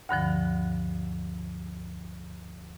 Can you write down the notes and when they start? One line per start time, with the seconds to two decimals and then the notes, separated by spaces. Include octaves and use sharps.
0.09 D2 G2 D3 F3